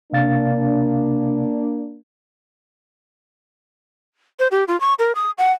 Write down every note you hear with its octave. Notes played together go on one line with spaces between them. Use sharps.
C3 A#3 D4 F5 A6
C5
G4
F4
C#6
A#4
D#6
F#5